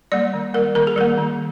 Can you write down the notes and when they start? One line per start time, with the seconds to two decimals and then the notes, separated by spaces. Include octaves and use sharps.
0.12 G3 A#3 D5
0.34 D#3
0.54 G3 A#3 A#4
0.75 D#3 A#4
0.87 G#4
0.96 G3 A#3 A#4
1.18 D#3